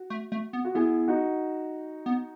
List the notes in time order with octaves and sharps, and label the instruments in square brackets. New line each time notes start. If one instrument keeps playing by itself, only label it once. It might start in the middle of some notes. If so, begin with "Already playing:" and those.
Already playing: [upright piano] F#4
[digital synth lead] A3
A3
B3
[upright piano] F#4
[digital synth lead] B3 [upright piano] E4 G#4
[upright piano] D#4 F#4
[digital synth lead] B3